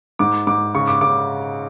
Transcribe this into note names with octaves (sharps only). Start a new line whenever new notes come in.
G#2 D6
G#2 D6
C#3 C#6
D6
C#3 D6